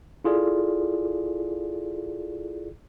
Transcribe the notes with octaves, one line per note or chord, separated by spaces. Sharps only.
E4 F4 G#4 A4 D5